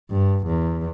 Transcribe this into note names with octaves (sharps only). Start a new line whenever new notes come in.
G2
E2